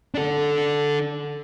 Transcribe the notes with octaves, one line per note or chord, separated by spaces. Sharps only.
D4 A4